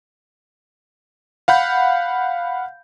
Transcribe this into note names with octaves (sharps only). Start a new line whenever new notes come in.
F5 F#5 B5 G6